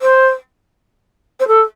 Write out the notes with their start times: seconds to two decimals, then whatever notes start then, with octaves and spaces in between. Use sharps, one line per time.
0.01 C5
1.40 C5
1.47 A4